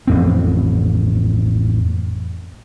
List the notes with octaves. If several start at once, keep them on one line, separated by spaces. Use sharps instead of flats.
A1 F2 C4